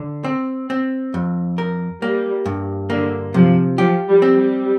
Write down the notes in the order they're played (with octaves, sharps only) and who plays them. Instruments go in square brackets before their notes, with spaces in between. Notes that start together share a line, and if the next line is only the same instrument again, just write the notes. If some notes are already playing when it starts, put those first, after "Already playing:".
Already playing: [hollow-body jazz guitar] D3
C4
C4
F2
A#4
[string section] G3 [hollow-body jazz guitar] A#3
[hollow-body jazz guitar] G2
[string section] D3 [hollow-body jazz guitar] A#3
[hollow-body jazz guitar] C3 [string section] F3
[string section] F3 [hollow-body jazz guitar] G4
[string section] G3
[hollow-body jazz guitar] C4
[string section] G3